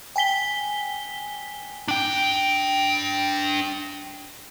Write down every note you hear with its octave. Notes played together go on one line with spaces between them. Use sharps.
G5 G#5 B6 G7
D4 G5